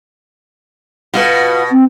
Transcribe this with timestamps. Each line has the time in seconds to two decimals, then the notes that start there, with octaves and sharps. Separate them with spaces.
1.14 B2 F4 F#4 B4
1.72 C4